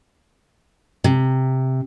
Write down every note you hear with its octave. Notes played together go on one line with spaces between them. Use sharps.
C3